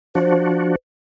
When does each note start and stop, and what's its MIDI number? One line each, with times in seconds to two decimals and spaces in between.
0.15 0.76 53
0.15 0.76 62
0.15 0.76 66
0.15 0.75 72